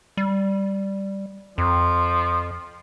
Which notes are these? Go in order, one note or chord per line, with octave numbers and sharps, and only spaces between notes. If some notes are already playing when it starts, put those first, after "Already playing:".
G3
F2 F3